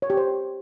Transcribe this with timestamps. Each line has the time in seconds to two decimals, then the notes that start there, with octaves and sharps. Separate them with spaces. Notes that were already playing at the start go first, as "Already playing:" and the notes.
0.02 C#5
0.10 G4
0.17 C5